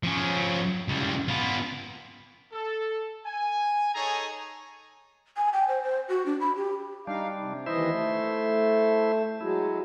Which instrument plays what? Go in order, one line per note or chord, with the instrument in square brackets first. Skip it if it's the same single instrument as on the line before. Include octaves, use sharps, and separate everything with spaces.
[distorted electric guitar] F3 C#4
C#2 G3
B3 F4
[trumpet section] A4
G#5
D#4 G#4 A4 C#5 G#5 A#5
[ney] G#5
G5
C5
C5
F#4
D4
B5
G4
[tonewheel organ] G3 D4 [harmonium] D#4 F5
[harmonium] C3
[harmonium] D#2 E3 D#5 [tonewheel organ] E4 C5 E5
[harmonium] A3
[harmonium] F#3 G#3 [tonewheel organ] E4